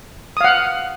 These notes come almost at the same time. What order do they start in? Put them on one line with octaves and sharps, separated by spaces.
D#6 F5 F#5